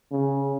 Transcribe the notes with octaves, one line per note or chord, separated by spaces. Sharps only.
C#3